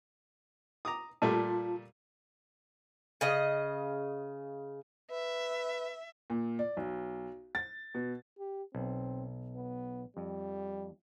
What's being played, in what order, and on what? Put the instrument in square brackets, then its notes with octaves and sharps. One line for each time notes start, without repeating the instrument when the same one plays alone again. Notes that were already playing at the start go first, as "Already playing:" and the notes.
[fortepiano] A#5 D6 D#6
[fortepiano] A#2 G3 A3 [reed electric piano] F4 A5
[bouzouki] C#3 D#5
[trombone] B4 [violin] E5
[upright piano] A#2
D5
B1
A6
B2
[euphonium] G4
[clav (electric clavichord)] B1 [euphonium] C4
[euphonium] B3
[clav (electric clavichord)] F2 [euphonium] G3